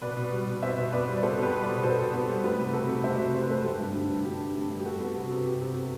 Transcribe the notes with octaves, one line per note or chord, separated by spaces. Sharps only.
B2 B4 D5
B2
G3
B2
B3 C5 E5
B2
B3 B4 D5
G3
D5
B2 A4 C5
B3
G4 B4
G3
B2 B4 D5
B2 A4 C5
B2
B3
G3
A3 G4 B4
C3
C3 F#4 A4
C3
A3 C5 E5
C3
C3 C5
B4
A3 A4 C5
A3 G4
G2
D3
G2
D3 G4
D3
A3
G2
G4
G3 F#4 A4
B3
C3
C3
C3 G4
C3
C3